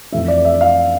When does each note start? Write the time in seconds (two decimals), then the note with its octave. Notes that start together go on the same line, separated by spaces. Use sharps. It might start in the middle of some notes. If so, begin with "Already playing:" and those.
0.12 F2 E3 A3 E5
0.28 D5
0.45 E5
0.61 F5